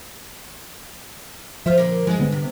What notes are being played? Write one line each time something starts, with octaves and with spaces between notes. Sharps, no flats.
F3 F4 C5 E5
A#2 D3 A#3
G2 F3 G#3
D3 B3
C3